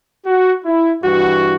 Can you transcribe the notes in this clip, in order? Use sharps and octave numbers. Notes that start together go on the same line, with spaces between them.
F#4
E4
G2 E3 F#4